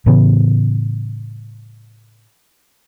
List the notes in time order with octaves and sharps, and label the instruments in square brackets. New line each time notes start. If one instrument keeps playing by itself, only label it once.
[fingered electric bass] A2 C#3 E3 B3